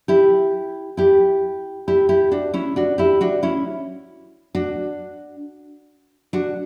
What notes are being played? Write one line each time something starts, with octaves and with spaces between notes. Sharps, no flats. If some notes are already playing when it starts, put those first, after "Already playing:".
E4 G4
E4 G4
E4 G4
E4 G4
D4 F#4
C#4 E4
D4 F#4
E4 G4
D4 F#4
C#4 E4
D4 F#4
D4 F#4